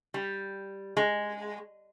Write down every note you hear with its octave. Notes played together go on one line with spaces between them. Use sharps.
G3
G#3